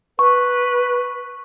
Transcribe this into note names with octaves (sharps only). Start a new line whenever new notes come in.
B4 C#6